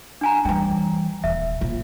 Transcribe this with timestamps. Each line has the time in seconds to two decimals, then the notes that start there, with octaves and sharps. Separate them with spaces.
0.21 D4 G#5 A#5
0.45 E3 G3 G5
1.24 D#1 E5
1.61 A#1 F4